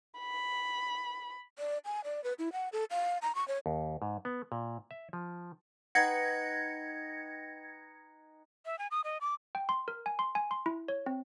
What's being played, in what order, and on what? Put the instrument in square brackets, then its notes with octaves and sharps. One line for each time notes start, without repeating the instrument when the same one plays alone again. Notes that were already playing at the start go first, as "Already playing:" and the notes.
[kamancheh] B5
[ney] D5
G#5
D5
B4
E4
F#5
A4
F5
A#5
C#6
C#5
[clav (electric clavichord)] D#2
G#2
B3
A#2
E5
F3
[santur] D#4 B4 G5 [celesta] F#5 [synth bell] G#6 A#6 C#7
[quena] E5
G#5
D#6
D#5
D6
[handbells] G5
C6
A#4
G#5
C6
G#5
C6
E4
C#5
C4